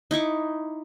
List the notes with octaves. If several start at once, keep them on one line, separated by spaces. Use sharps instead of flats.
D#4 E4 C#6 D6